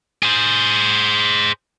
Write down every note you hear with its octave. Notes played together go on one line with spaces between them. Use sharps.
G#4 C5